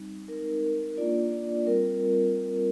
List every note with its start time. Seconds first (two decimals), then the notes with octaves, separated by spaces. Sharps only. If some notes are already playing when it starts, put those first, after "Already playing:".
Already playing: G3 C4 D#4
0.28 G#3 C4 D#4 A#4
0.62 A#4
0.97 A#3 D4 F4 D5
1.32 D5
1.67 G3 C4 F4 A#4